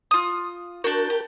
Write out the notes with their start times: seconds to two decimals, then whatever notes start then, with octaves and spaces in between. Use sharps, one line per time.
0.11 F4 D#6
0.84 D4 F#4 A#4 G6
1.10 G4